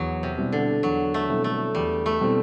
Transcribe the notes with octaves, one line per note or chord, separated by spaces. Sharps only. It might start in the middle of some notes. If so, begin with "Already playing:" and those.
Already playing: E2 F#3
C3
B2 G3 C4 E4
D3
E2 F#3
A3
B2 G3 C4 E4
A3
E2 G3
A3
B2 G3 C4 E4